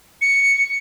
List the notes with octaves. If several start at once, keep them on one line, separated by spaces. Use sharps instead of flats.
C#7